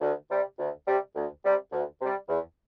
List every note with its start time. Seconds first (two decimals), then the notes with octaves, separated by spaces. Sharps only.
0.01 D2
0.30 C3 G3
0.58 D2
0.86 C3 G3
1.15 D2
1.44 C3 G3
1.72 D2
2.00 C3 G3
2.28 E2